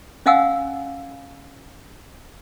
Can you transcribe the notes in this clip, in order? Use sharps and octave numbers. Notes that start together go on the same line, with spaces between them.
C#4 D#5 F5 F#5 G#5 E6